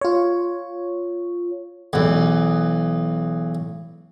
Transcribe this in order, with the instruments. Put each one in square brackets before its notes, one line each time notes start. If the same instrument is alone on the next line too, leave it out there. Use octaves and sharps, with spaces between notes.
[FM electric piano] F4 C#5
[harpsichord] B1 E2